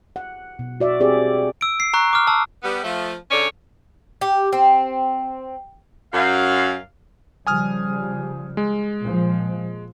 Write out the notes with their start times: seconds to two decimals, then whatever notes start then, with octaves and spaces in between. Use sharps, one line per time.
0.16 F#5
0.59 B2
0.80 F#4 D5 E5
1.00 C4 G4 G#4 D5
1.61 E6 D7
1.80 C7
1.93 A#5 C#6 F#6
2.13 D6 F6
2.27 A5 E6
2.63 G3 B3
2.83 F3 A3
3.31 G#2 D3 C#4 C#5 D5
4.21 G4
4.53 C4
6.13 F#2 F5
7.47 C#3 F3 G3 G#5 D#6 F6
8.57 G#3
9.01 A#2 F3